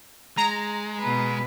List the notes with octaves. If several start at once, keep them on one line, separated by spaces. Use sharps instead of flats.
G#3 A#5
B2 B4